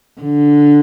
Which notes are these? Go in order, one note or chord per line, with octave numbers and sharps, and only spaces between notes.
D3